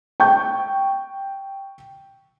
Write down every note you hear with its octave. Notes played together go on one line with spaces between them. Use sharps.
G5 C#6 G6